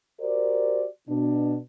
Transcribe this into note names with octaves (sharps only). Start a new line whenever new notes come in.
F#4 G4 A#4 C5 D5
B2 D4